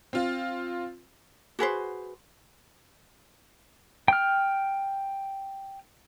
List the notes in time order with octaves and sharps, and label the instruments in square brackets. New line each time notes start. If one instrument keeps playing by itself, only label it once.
[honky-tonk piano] C4 F4
[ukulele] F#4 G#4 B4 C5
[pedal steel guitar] G5 F6